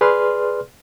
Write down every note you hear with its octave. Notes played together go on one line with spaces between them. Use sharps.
G#4 B4 D5 C6 F6